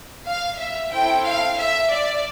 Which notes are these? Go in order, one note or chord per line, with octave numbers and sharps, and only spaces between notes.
F5
E5
C4 E4 A4 G5
F5
E5
D5